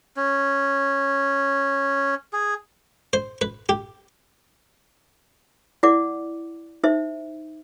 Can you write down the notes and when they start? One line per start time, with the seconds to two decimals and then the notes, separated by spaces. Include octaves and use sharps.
0.17 C#4
2.33 G#4
3.13 C5
3.41 B4
3.69 G4
5.83 E4 D5 F#5 D6
6.84 D#4 C5 E5